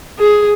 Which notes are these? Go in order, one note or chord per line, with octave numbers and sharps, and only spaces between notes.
G#4